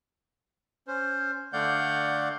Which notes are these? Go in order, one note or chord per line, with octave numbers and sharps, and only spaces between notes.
C#4 C5
D3 A3 D5 F5 F#5 G6